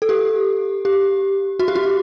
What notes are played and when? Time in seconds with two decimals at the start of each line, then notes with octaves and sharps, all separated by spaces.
0.02 A4
0.09 G4
0.85 G4
1.59 F#4
1.68 G4
1.75 F#4